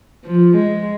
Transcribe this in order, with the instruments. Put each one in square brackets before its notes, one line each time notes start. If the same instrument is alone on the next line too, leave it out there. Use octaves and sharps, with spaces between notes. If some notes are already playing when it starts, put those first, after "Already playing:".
[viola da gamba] F3
G#3